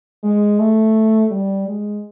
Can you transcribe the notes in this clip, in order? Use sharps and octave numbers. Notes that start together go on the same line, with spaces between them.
G#3
A3
G3
G#3